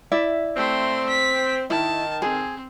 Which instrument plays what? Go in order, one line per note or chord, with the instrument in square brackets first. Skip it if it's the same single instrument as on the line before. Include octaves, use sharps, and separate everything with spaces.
[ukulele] E4 D5 E5
[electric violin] A3 C6 [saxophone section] C4
[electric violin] B6
[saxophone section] D#3 [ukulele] E4 [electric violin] A5
[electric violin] C4 [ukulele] G#4